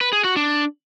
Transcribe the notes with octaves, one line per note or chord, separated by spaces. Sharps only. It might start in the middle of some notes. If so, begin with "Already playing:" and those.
B4
G#4
F#4
D4